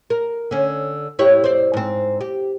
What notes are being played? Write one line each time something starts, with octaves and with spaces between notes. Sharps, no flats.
A#4
D3 C#4
E4 G4 C#5
C5 D5
G#2 C4
G4